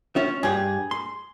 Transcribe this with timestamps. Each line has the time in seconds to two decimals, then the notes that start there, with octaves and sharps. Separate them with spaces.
0.16 C#4 F4 E5
0.43 G2 G4 G#4
0.91 C6